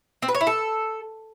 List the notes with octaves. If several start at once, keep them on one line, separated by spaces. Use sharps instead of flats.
C4
B4
C#5
E4
A4